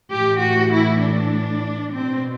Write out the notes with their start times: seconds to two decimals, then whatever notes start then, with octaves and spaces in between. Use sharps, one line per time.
0.13 A2 E3 G4
0.42 F#4
0.73 E4
1.02 D4
1.93 B2 C4